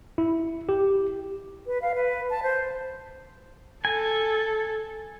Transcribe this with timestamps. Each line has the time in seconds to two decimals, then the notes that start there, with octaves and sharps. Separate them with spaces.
0.18 E4
0.69 G4
1.67 B4
1.82 F5
1.95 B4
2.30 A5
2.43 C5
3.85 A4 G#5